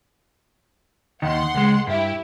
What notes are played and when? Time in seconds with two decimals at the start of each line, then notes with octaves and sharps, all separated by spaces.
1.22 D#2 D#3 F#5 C6
1.55 C#2 G#3
1.87 G2 E4 G4